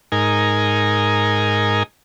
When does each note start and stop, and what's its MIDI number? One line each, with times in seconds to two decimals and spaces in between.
0.12 1.83 44
0.12 1.83 63
0.12 1.83 70
0.12 1.83 80